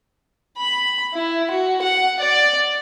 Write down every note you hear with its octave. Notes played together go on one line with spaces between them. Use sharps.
B5
E4
F#4
F#5
D5